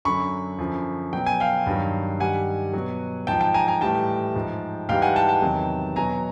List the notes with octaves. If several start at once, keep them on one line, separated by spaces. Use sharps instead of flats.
F#2 D3 F#3 B5 C#6
F#2 D3 F3
B2 F#3 G5
G#5
F5 G5
G2 D#3 F#3
G2 D#3 G3 F#5 G#5
B2 F#3
G#2 F3 G5 A5
G5 A5
G#5 A#5
G#5 A#5
A2 E3 G3 G5 A5
G#2 F3
G#2 E3 G3 F5 G5
F#5 G#5
G5 A5
G5 A5
E2 C3 D#3 F#3
B2 F#3 G#5 A#5